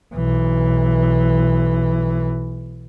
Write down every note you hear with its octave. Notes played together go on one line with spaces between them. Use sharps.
B1 E3